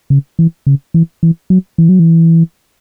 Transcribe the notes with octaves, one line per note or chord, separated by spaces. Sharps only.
C#3
E3
C#3
E3
E3
F#3
E3
F#3
E3